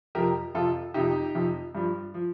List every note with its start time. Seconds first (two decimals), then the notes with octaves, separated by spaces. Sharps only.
0.15 F2 C3 F3 G4 A#4
0.54 F2 C3 F3 F4 A4
0.94 F2 C3 F3 D#4 G4
1.35 F2 C3 F3
1.75 G2 F3
2.14 F3